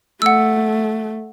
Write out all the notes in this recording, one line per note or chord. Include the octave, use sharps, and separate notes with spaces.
A3 F#5 E6